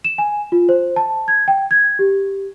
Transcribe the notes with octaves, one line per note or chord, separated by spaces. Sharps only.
E7
G#5
F4
C5
A5
G#6
G5
G#6
G4